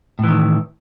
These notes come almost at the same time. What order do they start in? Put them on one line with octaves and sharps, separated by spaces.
A2 E3 D#3